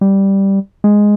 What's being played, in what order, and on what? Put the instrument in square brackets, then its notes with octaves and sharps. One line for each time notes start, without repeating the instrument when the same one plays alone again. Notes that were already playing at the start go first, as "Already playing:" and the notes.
[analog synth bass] G3
G#3